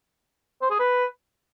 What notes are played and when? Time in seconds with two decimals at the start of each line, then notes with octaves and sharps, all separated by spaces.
0.62 C5
0.70 G#4
0.79 B4